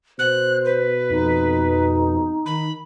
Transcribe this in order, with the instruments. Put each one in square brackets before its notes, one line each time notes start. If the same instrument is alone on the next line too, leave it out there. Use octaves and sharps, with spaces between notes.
[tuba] B2 [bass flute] C5 [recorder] F#6
[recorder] B4
[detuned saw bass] F2 [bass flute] D#4
[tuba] D#3 [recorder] B5